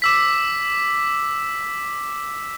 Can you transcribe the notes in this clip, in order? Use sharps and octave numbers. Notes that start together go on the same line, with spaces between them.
D6 E6 B6